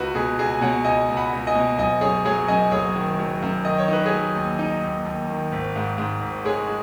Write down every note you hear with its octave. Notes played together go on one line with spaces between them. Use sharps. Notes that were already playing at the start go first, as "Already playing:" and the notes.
Already playing: C#2 F#4 B4
B2 G#4
C#2 G#4
G#5
B2 C#5 F#5
C#2 D#5 G#5
C#2
F#5 B5
C#2
D#5 G#5
B2
F#1 D#5 G#5
F#2 G#4 C#5
F#3 G#4 C#5
F#2 D#5 G#5
F#1 G#4 C#5
D#3
F#3
F#2
D#3 D#5
C#5
D#4 B4
G#4 C#5
F#3
D#2
D#4
D#2
D#2
D#3
G#1
G#2
G#2
G#1
G#3 G#4 C#5
G#3